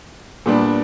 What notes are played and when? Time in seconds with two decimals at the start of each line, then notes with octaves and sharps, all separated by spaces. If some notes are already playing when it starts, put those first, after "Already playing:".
0.46 A#2 G3 B3 D4